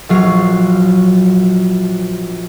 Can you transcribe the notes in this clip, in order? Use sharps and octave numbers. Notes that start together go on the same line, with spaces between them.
A#1 F#3 F5